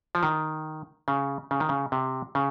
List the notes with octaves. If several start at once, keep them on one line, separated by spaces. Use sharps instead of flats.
F3
D#3
C#3
C#3
D#3
C#3
C3
C#3